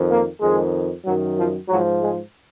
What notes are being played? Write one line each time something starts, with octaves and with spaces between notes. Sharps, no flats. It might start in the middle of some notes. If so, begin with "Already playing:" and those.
Already playing: F2 D#3
A#3
F2 D#3 G#3
F#2 D#3 F#3
F3
G#2 F3 F#3
G#3